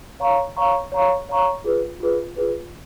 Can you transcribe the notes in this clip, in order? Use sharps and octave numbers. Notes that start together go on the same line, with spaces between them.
C#5 F5 A#5 C#6
C#5 F5 A#5 C#6
C#5 F5 A#5 C#6
C#5 F5 A#5 C#6
F4 G#4 B4
F4 G#4 B4
F4 G#4 B4